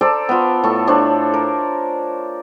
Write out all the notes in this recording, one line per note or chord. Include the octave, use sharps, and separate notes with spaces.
A4 C5 D5 A#5
B3 F4
A2 A4 C#6
D4 C5 C#5
A#4